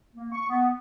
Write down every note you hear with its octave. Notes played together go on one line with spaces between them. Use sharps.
A#3
C#6
B3